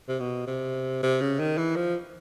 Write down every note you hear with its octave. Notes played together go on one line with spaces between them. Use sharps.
C3
B2
C3
C3
C#3
D#3
E3
F3